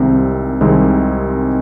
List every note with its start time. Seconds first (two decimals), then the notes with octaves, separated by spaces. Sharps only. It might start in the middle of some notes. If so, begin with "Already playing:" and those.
Already playing: C2 C3 D#3 G#3 C4
0.61 C2 C3 D#3 G#3 C4